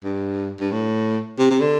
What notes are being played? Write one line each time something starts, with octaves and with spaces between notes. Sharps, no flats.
G2
G2
A2
C3
C3
D3